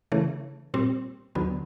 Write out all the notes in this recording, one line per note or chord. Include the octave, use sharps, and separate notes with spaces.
C#3 E3 A3
A#2 G3 C4
D#2 D3 F#3 B3